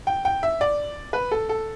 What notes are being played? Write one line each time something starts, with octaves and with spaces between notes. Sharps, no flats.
G5
G5
E5
D5
B4
A4
A4